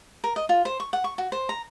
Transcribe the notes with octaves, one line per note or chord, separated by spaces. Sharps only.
A#4
D#5
F4
C5
C#6
F#5
C#6
F#4
C5
A#5